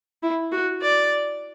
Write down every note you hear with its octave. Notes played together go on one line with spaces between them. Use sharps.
E4
F#4
D5